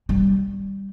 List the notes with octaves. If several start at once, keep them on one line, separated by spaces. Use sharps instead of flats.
G3